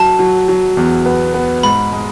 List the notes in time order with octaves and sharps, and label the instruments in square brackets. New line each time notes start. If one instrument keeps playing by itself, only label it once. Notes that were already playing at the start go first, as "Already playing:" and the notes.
Already playing: [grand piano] F#3 [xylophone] A5
[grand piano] F#3
F#3
E2
B3
B3
[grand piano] G#2 [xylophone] B5
[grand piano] G#3